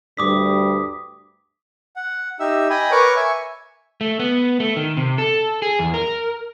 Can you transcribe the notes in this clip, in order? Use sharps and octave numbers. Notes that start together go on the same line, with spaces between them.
D2 G2 G3 D6 D#6 B6
F#5
D#4 G4 E5 E6
D#5 G5 G#5 B5 D#6
A#4 B4 C#5 C#6 D6
E5 G#5 C#6
A3
B3
A3
D#3
C3
A4
G#4
E2
A#4